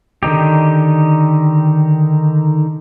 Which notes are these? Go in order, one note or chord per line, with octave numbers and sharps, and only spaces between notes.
D3 D#3 D#4 G4